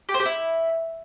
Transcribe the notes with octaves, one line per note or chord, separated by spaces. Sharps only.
G4
C5
G4
E4